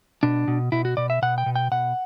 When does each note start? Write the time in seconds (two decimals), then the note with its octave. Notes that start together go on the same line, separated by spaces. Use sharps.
0.23 B2 D4
0.48 B2
0.72 B2 E4
0.85 F#4
0.97 B2 D5
1.10 E5
1.22 B2 F#5
1.38 G5
1.46 B2
1.56 G5
1.72 B2 F#5